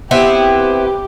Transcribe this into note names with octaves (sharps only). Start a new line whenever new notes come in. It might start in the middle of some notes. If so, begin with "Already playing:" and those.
B3 C4 E4 G4